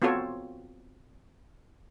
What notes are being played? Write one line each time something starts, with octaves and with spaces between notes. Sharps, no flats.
B3 C4 F4 F#4 A4 C#5